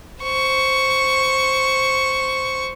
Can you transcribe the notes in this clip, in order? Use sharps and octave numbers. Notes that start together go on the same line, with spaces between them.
C5 C#6